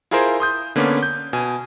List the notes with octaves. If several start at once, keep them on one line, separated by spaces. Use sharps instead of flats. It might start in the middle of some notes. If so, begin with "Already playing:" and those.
E4 F4 G#4 A#4 C5
C6 D#6 G6
D3 A#3 B3 C#4
G6
B2 G#5